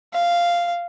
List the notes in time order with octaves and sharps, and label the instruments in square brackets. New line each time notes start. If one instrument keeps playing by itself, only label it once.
[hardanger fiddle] F5